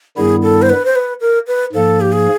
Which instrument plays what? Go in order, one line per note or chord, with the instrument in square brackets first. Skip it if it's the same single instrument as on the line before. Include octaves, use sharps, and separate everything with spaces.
[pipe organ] G2 D#3 G3 B3 E4 [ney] G#4
[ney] A4
C5
B4
C5
B4
A#4
B4
[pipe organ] G#2 F3 A#3 [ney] A4
[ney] G4
G#4